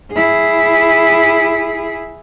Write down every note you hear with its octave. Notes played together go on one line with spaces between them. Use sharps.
E4 G#4